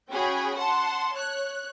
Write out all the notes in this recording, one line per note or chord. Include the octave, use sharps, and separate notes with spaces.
C#4 F#4 G#4 G5 B5
F#5 A5 C6
C#5 F#6